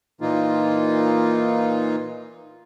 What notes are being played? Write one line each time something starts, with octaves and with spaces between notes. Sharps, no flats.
A#2 E3 A#3 D#4 F4